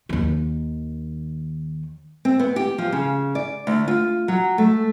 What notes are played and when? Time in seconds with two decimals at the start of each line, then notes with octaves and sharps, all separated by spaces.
0.09 D#2 D#3
2.25 C4
2.39 B3
2.56 G4
2.78 F3
2.92 C#3
3.35 D5
3.67 D2
3.88 F4
4.28 F#3
4.58 A3